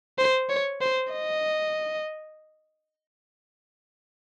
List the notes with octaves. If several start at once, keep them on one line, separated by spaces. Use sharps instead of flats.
C5
C#5
C5
D#5